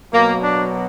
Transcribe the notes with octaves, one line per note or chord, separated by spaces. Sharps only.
B2 F#3 A#3
D4